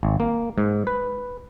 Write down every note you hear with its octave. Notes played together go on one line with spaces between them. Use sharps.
G#1
A#3
G#2
B4